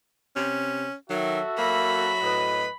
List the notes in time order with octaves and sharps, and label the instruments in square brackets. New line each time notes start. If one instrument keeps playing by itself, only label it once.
[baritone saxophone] C3 [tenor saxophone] C#4
[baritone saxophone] D#3 [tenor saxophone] F#3 [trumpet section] F#4 A4 E5
[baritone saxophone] F#3 [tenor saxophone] A#3 [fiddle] B5
[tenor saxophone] A2 [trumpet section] B4 D#5